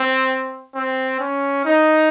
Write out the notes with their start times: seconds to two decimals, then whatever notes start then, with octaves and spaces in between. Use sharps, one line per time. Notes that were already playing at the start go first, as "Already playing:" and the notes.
Already playing: C4
0.75 C4
1.20 C#4
1.66 D#4